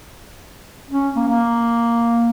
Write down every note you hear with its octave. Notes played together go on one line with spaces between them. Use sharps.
C#4
A#3
A#3